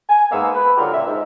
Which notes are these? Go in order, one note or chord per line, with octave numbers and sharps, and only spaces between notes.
G#5
G#2 G#3 A#3 B3 F5 E6
B4
D3 F#3 G#3 F4 G4 A#4
A#2 C#3 A#3 E5
G#2